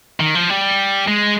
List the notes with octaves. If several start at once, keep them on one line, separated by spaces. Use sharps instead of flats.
D#3
F3
G3
G#3